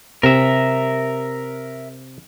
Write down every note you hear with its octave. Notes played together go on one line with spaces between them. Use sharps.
C3 A#4 E5